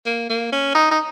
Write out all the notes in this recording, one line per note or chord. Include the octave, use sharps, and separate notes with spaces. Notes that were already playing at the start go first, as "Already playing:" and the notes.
A#3
A#3
C#4
D#4
D#4